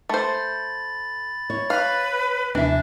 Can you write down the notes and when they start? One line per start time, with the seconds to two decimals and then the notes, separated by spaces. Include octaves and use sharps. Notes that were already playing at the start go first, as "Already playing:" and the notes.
0.09 A3 C5 B5 A6
1.50 C#5
1.70 B4 F5
2.55 D#2 C3 E3 F3 D4 E5